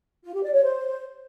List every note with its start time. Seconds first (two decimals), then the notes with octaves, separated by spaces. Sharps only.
0.24 F4
0.34 G4
0.44 D5
0.54 C#5
0.63 C5